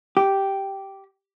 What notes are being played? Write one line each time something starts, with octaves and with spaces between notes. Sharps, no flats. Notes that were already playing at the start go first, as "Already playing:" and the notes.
G4